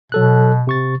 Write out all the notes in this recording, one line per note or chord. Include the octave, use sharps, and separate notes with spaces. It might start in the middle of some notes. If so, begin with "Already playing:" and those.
B2 F#3 A4 F#6
C3 C#6 A6